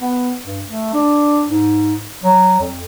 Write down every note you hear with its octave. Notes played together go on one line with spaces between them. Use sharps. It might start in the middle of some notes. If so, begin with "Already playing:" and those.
B3
G2
A3
D4
G#2
F#3
F2